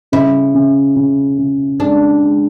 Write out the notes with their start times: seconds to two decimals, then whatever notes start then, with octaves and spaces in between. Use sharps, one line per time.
0.12 C#3 E4
0.55 C#3
0.96 C#3
1.38 C#3
1.80 G#3 D4
2.22 G#3